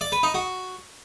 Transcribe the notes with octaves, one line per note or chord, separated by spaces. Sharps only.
D5
B4
D#4
F#4